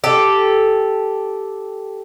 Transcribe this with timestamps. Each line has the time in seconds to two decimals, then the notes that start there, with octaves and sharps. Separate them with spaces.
0.04 G4 A4